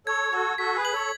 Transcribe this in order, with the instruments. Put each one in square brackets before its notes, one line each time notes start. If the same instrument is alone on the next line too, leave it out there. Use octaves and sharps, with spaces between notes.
[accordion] A4 C#5 [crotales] G#6
[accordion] F#4 A4 [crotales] G#6
[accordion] F#4 A4 [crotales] B6
[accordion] G#4 B4
[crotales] F#7
[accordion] A4 C#5